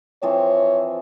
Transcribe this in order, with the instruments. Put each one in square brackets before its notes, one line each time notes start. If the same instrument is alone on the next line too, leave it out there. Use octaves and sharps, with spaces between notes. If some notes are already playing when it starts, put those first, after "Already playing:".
[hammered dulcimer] E3 F3 C4 [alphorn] C#5